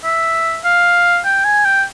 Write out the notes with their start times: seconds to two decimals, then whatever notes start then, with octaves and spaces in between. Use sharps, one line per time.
0.05 E5
0.65 F5
1.25 G5
1.45 G#5
1.65 G5